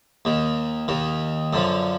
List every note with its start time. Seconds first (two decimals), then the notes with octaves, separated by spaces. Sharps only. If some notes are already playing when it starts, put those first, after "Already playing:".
0.25 D#2 D#3
0.88 D#2 D#3
1.53 F#2 D3 F3